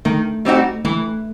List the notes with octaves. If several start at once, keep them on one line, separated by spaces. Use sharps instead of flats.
D#3 A3
G3 C4 D#4 F#4
E3 A3